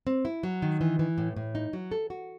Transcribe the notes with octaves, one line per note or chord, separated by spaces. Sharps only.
C4
E4
F#3
D#3
E3
E3
A2
A2
D#4
F#3
A4
F#4